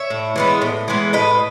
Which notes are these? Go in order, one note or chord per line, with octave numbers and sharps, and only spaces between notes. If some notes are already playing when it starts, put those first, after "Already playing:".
Already playing: C#5 E5
A2
E3 G#3 B3
A2
E3 G#3 B3
A2 B4 D#5